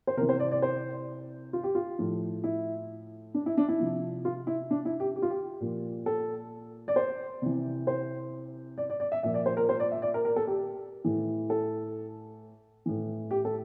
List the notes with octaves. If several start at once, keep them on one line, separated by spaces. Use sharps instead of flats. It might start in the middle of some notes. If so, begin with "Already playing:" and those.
C5
C3 E3 A#4
C5
D5
D5
C5
F4
G4
F4
A2 F3
E4
D4
E4
D4
E4
C3 F3
F4
E4
D4
E4
G4
G4
F4
G4
A#2 F3
A4
D5
C5
C3 E3
C5
D5
D5
D5
E5
A#2 F3 E5
D5
C5
A#4
C5
D5
E5
D5
A#4
A#4
A4
G4
A2 E3
A4
A2 E3
G4
A4